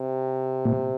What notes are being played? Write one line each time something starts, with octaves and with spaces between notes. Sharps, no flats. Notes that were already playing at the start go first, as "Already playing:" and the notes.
Already playing: C3
A#2